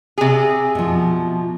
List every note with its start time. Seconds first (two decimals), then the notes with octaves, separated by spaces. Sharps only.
0.18 C3 G#4
0.75 B2 F3